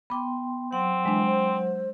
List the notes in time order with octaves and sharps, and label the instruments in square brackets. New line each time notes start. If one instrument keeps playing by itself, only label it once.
[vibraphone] B3 G5 C6 [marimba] B5 D6
[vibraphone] F#3 F#5 [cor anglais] C4
[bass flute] E3 [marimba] G#3 D4
[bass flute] C5